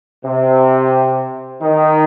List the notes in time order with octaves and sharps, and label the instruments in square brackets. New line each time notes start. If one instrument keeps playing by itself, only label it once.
[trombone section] C3
D#3